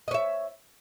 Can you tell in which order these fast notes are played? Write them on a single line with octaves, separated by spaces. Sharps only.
D#5 C#5 E5